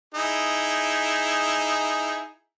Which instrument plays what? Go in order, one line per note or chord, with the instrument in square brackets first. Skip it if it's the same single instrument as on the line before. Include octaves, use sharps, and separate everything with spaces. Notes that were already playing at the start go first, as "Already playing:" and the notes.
[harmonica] D#4 E4 G#4